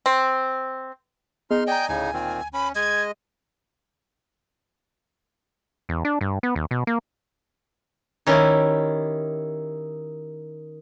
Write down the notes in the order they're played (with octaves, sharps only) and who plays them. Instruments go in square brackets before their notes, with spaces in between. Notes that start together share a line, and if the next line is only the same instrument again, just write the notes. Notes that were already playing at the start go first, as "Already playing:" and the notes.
[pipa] C4
[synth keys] B3 G#4 D#5 [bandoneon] D#4 C6 F6
[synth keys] D5 A#5 [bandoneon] D#5 G#5 [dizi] G5
[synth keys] D2 [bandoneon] A2 C#3 D#4 [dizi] G#5
[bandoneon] A#2 D#3 C4
[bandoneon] C#4 [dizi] B5
[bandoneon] G#3 D#5 [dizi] G#6
[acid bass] E2
D4
G2
B3
D#2
B2
A#3
[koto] D#3 C#4 E4 G4